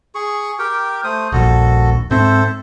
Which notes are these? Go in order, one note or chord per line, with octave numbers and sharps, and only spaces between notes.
G#4 C#6
G4 A#4 G5
A3 C5 D#6
D#1 A#1 F#4 A4
G#2 C4 A4 C5 E5